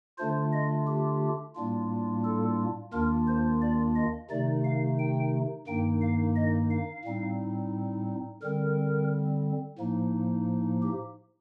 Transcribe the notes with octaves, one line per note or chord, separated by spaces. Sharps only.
D3 A3 D4 F4 C5
D#5
G4
A2 G3 A#3 D4 F4
A4
D#2 D#3 A#3 D4 F4 A#4
C5
D5
D#5
C3 D#3 A3 D#4 D5
F5
G5
G2 D#3 A#3 D#4 G5
F5
D#5
F5
A2 G3 C4 D#4
D3 G3 C4 A#4
A2 F3 A#3 D#4
G4